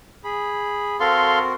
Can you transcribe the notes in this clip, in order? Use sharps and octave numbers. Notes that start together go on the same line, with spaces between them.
G#4 B5
C4 F#4 A4 A#4 F5 C6